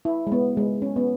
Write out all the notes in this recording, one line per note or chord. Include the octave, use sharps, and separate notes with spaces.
E4
G#3
B3
G#3
C#4
B3